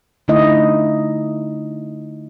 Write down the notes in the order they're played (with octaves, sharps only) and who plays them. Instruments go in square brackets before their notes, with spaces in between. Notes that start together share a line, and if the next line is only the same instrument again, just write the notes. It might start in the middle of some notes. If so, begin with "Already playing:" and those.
[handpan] D3 A3 D#4 E4 D#5